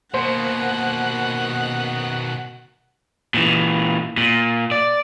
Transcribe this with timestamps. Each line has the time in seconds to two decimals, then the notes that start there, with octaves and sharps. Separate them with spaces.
0.14 B2 D#3 A#3 C5 F#5
3.34 A#2 E3
4.17 A#2
4.72 D5